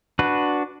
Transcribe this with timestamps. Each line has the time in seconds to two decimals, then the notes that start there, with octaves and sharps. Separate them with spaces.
0.19 D4 F#4 B4